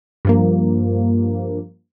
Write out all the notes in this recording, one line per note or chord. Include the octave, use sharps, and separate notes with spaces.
G2 F3 A#3